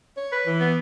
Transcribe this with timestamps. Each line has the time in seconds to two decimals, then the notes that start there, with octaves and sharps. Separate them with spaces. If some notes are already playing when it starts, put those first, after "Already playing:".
0.17 C#5
0.32 B4
0.46 E3
0.60 B3